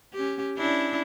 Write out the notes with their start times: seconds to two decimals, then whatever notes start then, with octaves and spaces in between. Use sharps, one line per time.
0.13 C#4 G4
0.56 C#4 D4 E4